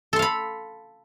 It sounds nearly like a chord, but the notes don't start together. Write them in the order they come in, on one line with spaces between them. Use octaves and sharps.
A4 C6 F5 B5